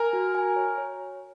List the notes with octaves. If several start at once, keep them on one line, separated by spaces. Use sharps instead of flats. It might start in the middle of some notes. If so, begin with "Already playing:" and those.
Already playing: A#4 G#5
F#4
G#5
C#5
C#5